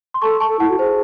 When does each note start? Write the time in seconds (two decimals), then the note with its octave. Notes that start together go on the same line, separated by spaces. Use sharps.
0.14 C6
0.22 A4 A5 C#6
0.40 A5 C#6
0.47 A4
0.59 E4 F#5 A5
0.69 F#4
0.79 G#4 C5